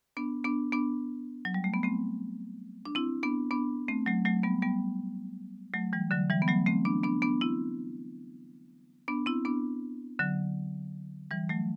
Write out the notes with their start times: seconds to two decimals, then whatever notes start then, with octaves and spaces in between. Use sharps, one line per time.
0.17 B3 D4
0.44 B3 D4
0.72 B3 D4
1.45 F#3
1.54 G3
1.64 A3
1.74 B3
1.83 A3 C4
2.86 D4
2.95 C4 E4
3.23 B3 D4
3.51 B3 D4
3.88 A3 C4
4.06 F#3 A3
4.25 F#3 A3
4.44 G3 B3
4.62 G3 B3
5.74 F#3 A3
5.93 E3 G3
6.11 D3 F#3
6.30 E3 G3
6.42 B3
6.48 F#3 A3
6.66 A3 C4
6.85 B3 D4
7.03 B3 D4
7.22 B3 D4
7.41 C4 E4
9.08 B3 D4
9.26 C4 E4
9.45 B3 D4
10.19 D3 F#3
11.31 E3 G3
11.49 F#3 A3